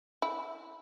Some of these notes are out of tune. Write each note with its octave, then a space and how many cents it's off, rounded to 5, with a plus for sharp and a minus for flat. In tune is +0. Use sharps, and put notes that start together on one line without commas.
E4 -5